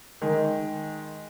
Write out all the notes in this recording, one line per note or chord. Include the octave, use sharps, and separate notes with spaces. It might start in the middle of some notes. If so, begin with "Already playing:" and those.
D#3 G#3